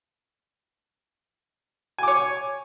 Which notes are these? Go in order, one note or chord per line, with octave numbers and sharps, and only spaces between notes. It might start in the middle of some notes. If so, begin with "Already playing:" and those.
C#5 G#5 D6